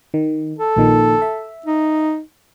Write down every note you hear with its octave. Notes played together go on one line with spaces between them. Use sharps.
D#3
A4
A#1 A#2 D#3
E5
D#4